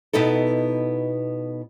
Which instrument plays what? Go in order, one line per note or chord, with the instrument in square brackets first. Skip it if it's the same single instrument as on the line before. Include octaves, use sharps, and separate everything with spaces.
[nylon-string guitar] B2 B3 D#4 E4 A4